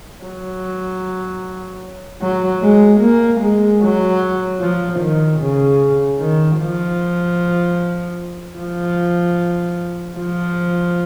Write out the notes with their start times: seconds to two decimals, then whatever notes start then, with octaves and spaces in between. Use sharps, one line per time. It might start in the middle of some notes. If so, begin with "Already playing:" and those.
0.24 F#3
2.22 F#3
2.62 G#3
3.01 A#3
3.41 G#3
3.82 F#3
4.61 F3
5.00 D#3
5.40 C#3
6.19 D#3
6.59 F3
8.59 F3
10.17 F3